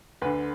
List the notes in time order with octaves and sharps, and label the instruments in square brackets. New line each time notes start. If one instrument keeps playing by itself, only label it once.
[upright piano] D2 D3 B4